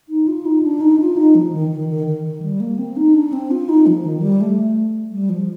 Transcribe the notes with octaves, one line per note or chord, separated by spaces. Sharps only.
D#4
F4
D#4
D4
D#4
F4
D#4
F3
D#3
D#3
D#3
D#3
D#3
G3
A#3
C4
D#4
D4
C4
F4
D#4
F3
D#3
F3
G3
A3
G3
F3